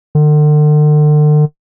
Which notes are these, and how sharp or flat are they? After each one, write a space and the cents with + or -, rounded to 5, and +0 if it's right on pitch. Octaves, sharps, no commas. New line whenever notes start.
D3 +40